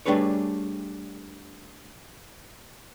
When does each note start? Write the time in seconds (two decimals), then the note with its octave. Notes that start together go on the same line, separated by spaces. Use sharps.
0.06 G3 A3 D4 G#4 B4 C#5